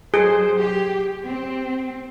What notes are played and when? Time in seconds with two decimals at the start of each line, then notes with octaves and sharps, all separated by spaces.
0.14 F#3 G#4 C5
0.58 G4
1.25 C4